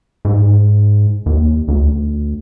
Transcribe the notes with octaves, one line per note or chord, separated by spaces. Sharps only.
G#2
D#2
D2